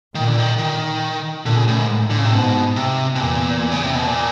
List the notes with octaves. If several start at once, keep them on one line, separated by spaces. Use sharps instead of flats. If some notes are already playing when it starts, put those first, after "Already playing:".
A#2 D#3
D3
D#3
D#3
A#2 D3
C#3
A2
G#2
A2
D3
C#3
C3
G#2 B2
C3
B2
E2 A#2
C#3
C3
B2
A#2